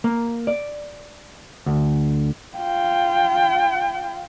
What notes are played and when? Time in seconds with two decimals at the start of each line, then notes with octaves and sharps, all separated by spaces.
0.04 A#3
0.47 D5
1.66 D2
2.57 F4 G5